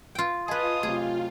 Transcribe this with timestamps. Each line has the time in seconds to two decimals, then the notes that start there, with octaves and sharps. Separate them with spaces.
0.15 F4 G5
0.48 F4 G#4 B4 D#5 G#5 A5 D#6
0.83 C3 F#3 A3 G#4